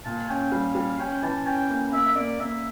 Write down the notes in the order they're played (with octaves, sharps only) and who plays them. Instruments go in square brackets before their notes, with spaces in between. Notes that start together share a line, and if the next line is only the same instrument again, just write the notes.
[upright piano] A#2 [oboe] A5
[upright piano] C#4 [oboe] G5
[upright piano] G3 [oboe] F5
[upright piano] G3
[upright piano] C#4 [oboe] G5
[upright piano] E3 [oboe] A5
[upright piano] C#4 [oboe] G5
[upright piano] A#3
[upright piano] A#3 [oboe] E5
[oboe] E5
[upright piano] A#3 [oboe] D5
[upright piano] A#3 [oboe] E5